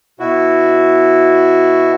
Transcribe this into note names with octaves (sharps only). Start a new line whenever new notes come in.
B2 E4 F#4